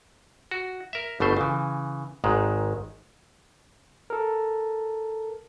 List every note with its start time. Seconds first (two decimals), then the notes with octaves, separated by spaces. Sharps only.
0.51 F#4
0.93 A#4 E5
1.20 G1 B2 A3 C5
1.37 C#3 E3
2.24 G#1 G#2 D#3 G#3
4.10 A4 A#4